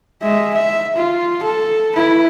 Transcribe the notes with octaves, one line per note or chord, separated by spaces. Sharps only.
G#3 E5
E5
F4
A4
E4 B4